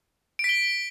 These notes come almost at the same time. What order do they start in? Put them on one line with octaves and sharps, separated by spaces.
D7 B6 G7